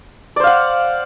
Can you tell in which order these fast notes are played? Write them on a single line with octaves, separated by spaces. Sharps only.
D5 C5 F5 F#5